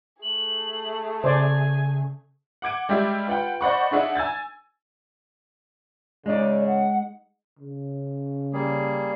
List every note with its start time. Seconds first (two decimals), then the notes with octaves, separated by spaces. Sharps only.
0.22 A3 G#4 F#7
1.24 C#3 C5 D5 G#5
2.62 F#5 D6 G#6 D7
2.89 G3 G#3 G4 E5
3.27 F4 B4 F#5 G5
3.61 C5 D5 D#5 F#5 B5 C#6
3.91 D4 D#4 G#4 E5 F#5
4.15 G#5 E6 G#6 A6
6.26 C#3 G#3 D#4 D5
6.66 F#5
7.59 C#3
8.53 G3 A#3 G#4